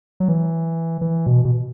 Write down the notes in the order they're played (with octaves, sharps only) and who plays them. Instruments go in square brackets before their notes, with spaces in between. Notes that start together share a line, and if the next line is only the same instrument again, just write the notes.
[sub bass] F#3
E3
E3
B2
B2